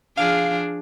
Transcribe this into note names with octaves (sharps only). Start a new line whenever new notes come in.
F3 D4 G#4 F5